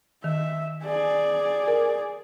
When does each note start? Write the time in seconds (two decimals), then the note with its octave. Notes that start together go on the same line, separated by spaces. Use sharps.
0.24 D#3 E5
0.84 G#4 D5
1.68 A#4